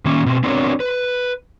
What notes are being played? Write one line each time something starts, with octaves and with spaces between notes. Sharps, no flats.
D#3 A#3 C#4
B2 C4
B3 C4 D4 F#4 A#4 C#5
B4